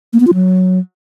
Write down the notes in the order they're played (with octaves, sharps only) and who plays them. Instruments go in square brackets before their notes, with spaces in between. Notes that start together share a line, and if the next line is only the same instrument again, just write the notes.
[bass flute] A#3
B3
F4
F#3